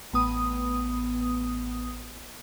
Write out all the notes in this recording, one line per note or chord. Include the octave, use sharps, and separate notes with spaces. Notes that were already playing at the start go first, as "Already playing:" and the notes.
A1 B3 D#6